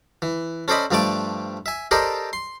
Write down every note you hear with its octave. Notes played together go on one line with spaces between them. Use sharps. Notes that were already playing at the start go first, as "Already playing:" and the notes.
E3
C#4 A4 C5 D5 D#5 B5
G2 F3 G3 A3 D5 D6
E5 G#5
G4 A4 A#4 C5 D5 D#5
C6